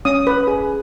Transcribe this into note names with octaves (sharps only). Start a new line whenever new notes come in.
C#4 D#6
B4
G#4